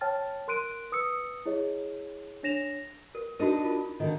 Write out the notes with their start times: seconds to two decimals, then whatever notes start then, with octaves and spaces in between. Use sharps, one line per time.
0.01 C#5 G5 A5 F6 A6
0.48 A#4 C6 F#6 D7 D#7
0.92 B4 D#6 E6 C#7
1.45 E4 G#4 C#5 D#5
2.43 D4 C#5 A#6 E7 F7
3.15 A#4
3.39 D4 D#4 F#4 A#4 D#5
3.64 F4 A#4
4.00 D3 D#3